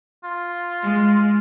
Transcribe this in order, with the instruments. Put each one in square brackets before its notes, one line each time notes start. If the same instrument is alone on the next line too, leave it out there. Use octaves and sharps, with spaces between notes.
[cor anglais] F4
[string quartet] G#3